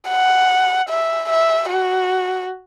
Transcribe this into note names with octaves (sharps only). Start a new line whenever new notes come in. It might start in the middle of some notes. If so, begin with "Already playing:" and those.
F#5
E5
E5
F#4